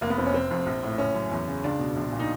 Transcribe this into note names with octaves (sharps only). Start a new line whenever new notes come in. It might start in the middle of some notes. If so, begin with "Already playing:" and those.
F1 A#3
B3
F2 C4
C#4
F1 C4
F2
A#1
A2
F#1 C#4
F#2
E2
C#3
C#2 D4
B2
A#1
A#2
D#4